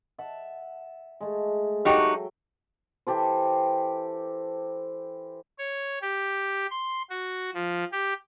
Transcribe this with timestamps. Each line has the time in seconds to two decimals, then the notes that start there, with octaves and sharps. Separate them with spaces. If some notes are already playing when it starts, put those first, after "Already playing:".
0.18 E5 F#5 A5
1.20 G#3 A3
1.85 F#3 A3 D#4 F#4 G4 G5
3.07 E3 G4 A4 C5
5.58 C#5
6.01 G4
6.71 C6
7.10 F#4
7.54 F3
7.92 G4